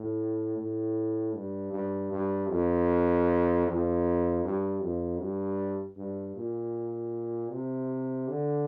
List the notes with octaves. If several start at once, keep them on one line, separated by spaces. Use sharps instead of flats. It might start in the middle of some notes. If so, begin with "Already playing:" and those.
Already playing: A2
A2
G2
G2
G2
F2
F2
G2
F2
G2
G2
A#2
C3
D3